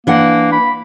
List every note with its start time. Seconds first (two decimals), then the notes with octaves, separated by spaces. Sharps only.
0.07 E3 A#3 D4 F#5
0.52 B5